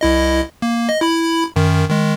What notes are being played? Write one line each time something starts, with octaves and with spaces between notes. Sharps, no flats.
C2 E4 D#5
A#3
D#5
E4 B5
F#2 D#3
D#3 G#3